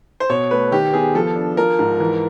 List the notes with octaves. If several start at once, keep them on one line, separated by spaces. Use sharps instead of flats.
C5
B2 C#5
A3 B4
D#3 G4
B3 G#4
F3 A4
D4
F3 A#4
G#2
E3